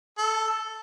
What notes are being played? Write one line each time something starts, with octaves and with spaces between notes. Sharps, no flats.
A4